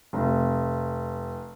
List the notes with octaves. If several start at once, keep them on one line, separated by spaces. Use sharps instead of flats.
F1